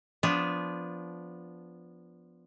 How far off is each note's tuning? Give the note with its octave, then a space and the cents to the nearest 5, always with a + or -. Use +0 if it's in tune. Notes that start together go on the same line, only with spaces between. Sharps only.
F3 +0 B3 +0 D4 -20